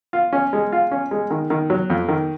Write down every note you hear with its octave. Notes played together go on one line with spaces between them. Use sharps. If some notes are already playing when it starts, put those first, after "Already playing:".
F4
C#4
G#3
F4
C#4
G#3
D#3
D#3
F#3
F2
D#3